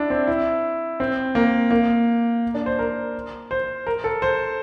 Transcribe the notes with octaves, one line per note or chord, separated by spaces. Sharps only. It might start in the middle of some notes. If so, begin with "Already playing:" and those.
Already playing: D4 E4
C4
E4
C4
A#3
A#3
D4
C5
A#4
C5
A#4
A4
C5